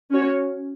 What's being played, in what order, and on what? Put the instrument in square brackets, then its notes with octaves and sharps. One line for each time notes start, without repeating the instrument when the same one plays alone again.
[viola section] C#4 F#4 C#5